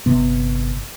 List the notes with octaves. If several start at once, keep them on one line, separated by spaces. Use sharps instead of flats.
G1 C3 B3